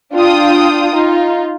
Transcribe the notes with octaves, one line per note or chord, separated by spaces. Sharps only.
D4 F4 G5 D#6
D#4 F4